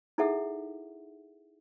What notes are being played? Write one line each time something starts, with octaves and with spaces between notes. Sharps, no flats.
D#4 E4 G#4 A4 E5 F#5